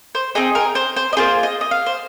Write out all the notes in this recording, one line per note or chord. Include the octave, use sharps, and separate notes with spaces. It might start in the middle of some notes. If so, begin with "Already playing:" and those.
C5
C4 D#4 G#4 D#5
A#4
C5
C5
D#5
A#3 F4 G#4 C5
D#5
D#5
F5
C5